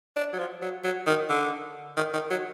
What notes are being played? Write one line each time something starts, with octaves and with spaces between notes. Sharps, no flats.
D4
F#3
F3
F#3
F#3
D#3
D3
D#3
D#3
F#3